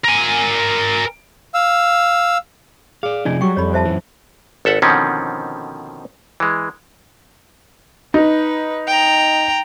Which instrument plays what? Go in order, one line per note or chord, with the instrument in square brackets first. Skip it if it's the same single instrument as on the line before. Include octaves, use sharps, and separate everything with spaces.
[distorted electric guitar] A#4 G#5
[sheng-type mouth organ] F5 E6
[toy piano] G#4 [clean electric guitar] D5 F5
[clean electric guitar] C3 F3 D#4 [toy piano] C#4 D5 G#5
[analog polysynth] F#3 [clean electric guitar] G3 [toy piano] G5 C#6
[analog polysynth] F2 [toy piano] C#5 B5
[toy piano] C5 E5 A5
[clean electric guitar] F#2 E3
[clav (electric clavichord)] G#1 A4 E5 F#5
B2 D3 D#3 F3 C4 C#4
E3 G#3
[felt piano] D#4 [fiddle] B4
[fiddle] G5 A#5